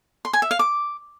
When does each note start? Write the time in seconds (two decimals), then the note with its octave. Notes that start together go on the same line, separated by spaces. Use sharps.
0.25 C6
0.33 G#5
0.42 E5
0.51 F5
0.59 D6